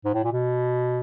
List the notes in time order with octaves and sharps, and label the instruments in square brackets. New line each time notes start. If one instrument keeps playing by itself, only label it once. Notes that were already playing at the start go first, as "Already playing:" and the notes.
[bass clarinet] G#2
A2
A#2
B2